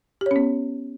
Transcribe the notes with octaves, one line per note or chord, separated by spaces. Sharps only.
B3 C#4 G4 C#5